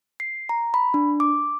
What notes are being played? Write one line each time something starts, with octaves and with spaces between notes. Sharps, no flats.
C7
A#5
B5
D4
D6